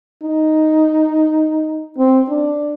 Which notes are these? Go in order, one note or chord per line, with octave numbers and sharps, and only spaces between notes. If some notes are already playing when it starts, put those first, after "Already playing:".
D#4
C4
D4